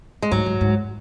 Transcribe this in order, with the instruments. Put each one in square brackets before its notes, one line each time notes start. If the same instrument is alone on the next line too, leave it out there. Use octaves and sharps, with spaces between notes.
[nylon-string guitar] G#3
[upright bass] G#2 [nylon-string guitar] F#3
[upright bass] G#2
G#2